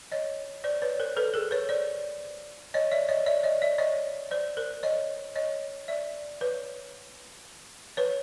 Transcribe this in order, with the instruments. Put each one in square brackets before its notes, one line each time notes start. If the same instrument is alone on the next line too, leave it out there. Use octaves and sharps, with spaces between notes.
[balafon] C#5 D#5
C5 D5
B4 C#5
A#4 C5
A4 B4
G#4 A#4
B4 C#5
C5 D5
C#5 D#5
D5 E5
C#5 D#5
D5 E5
C#5 D#5
D5 E5
C#5 D#5
C5 D5
A#4 C5
C#5 D#5
C#5 D#5
D5 E5
B4 C#5
B4 C#5